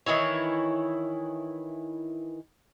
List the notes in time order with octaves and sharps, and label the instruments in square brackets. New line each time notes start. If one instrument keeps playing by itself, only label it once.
[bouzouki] D#3 E3 E4 C#5